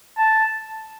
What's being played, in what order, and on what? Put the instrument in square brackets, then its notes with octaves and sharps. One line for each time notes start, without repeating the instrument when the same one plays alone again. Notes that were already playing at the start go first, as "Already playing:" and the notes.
[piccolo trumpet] A5